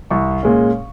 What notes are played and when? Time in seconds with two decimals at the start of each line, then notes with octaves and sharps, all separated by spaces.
0.11 C2 C#6
0.43 A#2 G#3 C#4